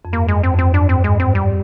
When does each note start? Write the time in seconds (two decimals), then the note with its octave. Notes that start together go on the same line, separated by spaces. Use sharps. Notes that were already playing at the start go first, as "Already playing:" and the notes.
0.05 F2
0.13 G2 A#3
0.28 F2 G#3
0.43 C4
0.54 F2
0.59 C4
0.74 G2 D4
0.89 C4
0.94 G#2
1.04 G#3
1.15 G2
1.20 C4
1.35 G3